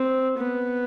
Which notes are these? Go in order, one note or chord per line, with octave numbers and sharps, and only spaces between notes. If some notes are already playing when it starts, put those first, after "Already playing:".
Already playing: C4
B3